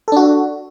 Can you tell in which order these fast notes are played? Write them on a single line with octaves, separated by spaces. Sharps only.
A4 D4 F#4